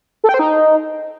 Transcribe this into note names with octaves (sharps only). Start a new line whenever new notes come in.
A4
G5
C5
D#4